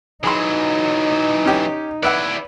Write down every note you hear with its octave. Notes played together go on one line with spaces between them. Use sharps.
E3 F#3 D#4 G#4 B5 C6
C#4 G4
E4 B4 D5 E5 F#5